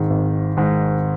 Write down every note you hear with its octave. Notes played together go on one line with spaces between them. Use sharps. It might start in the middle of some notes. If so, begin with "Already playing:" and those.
Already playing: G#1 G#2 D#3 G#3
G#1
G#2 D#3 G#3